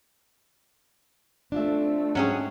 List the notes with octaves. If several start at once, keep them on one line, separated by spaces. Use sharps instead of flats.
A3 C4 D4 F4 E5
G#2 F#3 C#4 G#4 C#5 G5